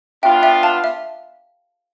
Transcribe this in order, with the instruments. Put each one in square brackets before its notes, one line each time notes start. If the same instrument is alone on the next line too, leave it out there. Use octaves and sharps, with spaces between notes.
[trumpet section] B3 D4 F4 [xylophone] E5 G5
[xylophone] E5 G5
F5 A5
E5